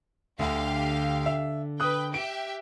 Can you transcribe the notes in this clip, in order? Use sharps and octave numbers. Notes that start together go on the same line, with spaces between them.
D2 D3 G4 F5 F#5
E5
B4 G5 D#6 F#6
G4 E5 D7